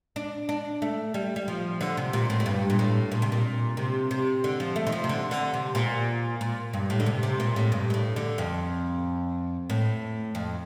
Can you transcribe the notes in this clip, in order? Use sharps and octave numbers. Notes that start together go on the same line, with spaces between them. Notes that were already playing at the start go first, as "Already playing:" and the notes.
D4
D4
A3
G3
G3
F3
D3
C3
A#2
A2
A2
G2
A#2
A2
A#2
C3
A#2
C3
C3
D3
F3
A3
D#3
F3
C3
D3
D3
C3
A#2
A#2
G2
A2
D3
C3
C3
A#2
A2
G2
A#2
A2
D3
F2
A2
F2